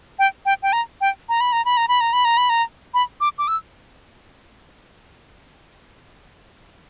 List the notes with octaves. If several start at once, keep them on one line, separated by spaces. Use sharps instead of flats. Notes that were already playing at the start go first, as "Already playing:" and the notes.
G5
G5
G5
A#5
G5
A#5
B5
A#5
B5
A#5
B5
A#5
B5
A#5
B5
A#5
B5
D6
D6
E6